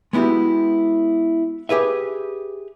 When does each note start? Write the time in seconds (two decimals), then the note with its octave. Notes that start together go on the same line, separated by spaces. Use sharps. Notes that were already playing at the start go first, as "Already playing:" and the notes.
0.13 G#3 B3 E4 F#4 G4
1.69 G4 G#4 B4 E5